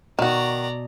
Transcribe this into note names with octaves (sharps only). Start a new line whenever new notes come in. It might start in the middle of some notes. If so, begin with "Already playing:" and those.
B2 D#3 F#4 D5 A#5